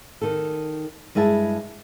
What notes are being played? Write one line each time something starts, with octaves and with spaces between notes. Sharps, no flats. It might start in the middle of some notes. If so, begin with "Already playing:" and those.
D#3 A4
G2 G#3 E4 E5 A5